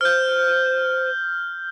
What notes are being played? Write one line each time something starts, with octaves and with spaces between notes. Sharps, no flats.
C5 F6 G6